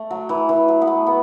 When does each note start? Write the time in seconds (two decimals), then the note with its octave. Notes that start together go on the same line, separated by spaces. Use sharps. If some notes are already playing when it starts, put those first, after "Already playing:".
Already playing: A3
0.11 F#3
0.29 E3
0.49 E3
0.68 F#3
0.82 B3
0.87 A3
1.07 B3